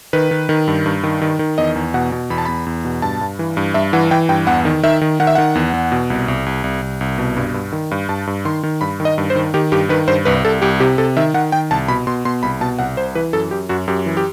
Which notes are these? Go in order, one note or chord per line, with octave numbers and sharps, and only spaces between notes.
D#3 B4
D#3
D#3
G2
G2
D#3
D#3
D#3
E2 D#5
E2
B2 F#5
B2
E2 B5
A5
E2 B5
E2
B2
G2 A5
G2
E3
G2
G2 E5
E3 F#5
E3 G5
G2 G5
E2 F#5
D#3
D#3 E5
D#3
D#3 F#5
E5
D#3 F#5
E2
E2
B2
C2
C2
C2
C2
C2
C2
B2
G2
G2
D#3
G2
G2 A5
G2
D#3 C6
D#3
G2 B5
D#3
D#5
G2
C5
D#3
D#3 G4
G2 G4
D#3 B4
G2 C5
C2 B4
C2 A4
C2 G4
C3 G4
C3 A4
D#3 E5
D#3 F#5
D#3 G5
C2 A5
B2 B5
B2 C6
B2 C6
C2 B5
B2 A5
C2 F#5
C2 C5
E3 B4
F#2 A4
F#2 G4
F#2 F#4
F#2 G4
E3
G4